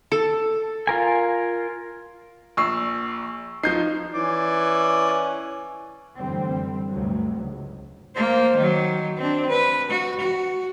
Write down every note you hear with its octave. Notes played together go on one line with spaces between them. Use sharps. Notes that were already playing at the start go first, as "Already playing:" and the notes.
A4
F4 A#4 G#5
A#1 C#6 E6 C7
F3 D#4 G6 C7
E3 C#4 D5
F#2 A2 D3 E3 G3 C4
D2 G2 C3 F#3
C#2
A#3 C5
D#3 F#3
C4 D4
B4
F#4
F#4